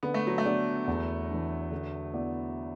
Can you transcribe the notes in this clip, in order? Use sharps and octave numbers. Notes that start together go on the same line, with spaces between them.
D3 B3
A3
F#3
A3
B3 D4 A4 D5
E2
E3 D4
D3
B3 E4 D5